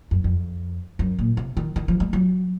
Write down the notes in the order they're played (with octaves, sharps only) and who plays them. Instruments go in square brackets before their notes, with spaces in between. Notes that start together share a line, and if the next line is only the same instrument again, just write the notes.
[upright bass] F#2
F2
F#2
A#2
C3
D#3
D#3
F3
G#3
F#3